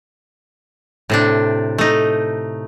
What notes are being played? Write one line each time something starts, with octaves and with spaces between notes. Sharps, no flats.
A2 C3 D4
A3 D#4